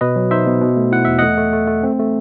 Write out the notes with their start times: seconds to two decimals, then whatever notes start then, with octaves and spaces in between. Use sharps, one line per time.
0.01 B2 B4 D#5
0.16 F#3
0.31 D#4 C5 E5
0.46 B2
0.61 B2
0.77 A3
0.92 E4 F#5
1.05 E2 E5
1.18 A3 D#5 F#5
1.37 A3
1.53 A3
1.68 A3
1.83 C4
1.99 A3